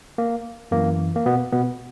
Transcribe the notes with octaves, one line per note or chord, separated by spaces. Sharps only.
A#3
F#2 E3 A#3
A#3
B2 B3
B2 B3